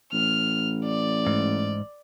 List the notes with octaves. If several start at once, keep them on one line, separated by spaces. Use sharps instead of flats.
A1 F6
D5
G#2